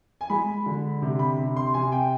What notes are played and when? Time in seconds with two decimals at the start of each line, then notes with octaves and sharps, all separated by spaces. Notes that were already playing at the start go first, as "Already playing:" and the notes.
0.21 G#5
0.30 G#3 B5
0.66 D3
1.02 C3
1.19 B5
1.38 C3
1.56 C6
1.74 C3 G#5
1.92 G5